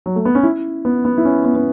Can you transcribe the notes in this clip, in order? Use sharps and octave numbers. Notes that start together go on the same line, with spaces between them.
F#3
A3
B3
C#4
E4
B3
B3
E4
C#4
B3
B3